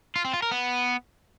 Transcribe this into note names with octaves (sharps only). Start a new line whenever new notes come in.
F4
C4
F4
A#4
B3